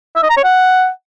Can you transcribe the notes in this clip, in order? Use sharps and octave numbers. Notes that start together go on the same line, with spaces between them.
E5
D#5
A#5
C#5
F#5